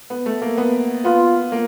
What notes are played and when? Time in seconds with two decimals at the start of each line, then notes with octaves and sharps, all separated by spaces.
0.10 B3
0.26 A3
0.42 A#3
0.57 B3
1.05 B3 F4
1.52 A#3